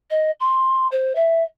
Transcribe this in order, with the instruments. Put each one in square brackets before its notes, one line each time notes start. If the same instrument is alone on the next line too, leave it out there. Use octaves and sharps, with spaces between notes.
[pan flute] D#5
C6
C5
E5